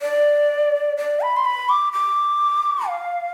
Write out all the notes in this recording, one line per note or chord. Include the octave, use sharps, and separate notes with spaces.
D5
D5
B5
C6
B5
D6
D6
F5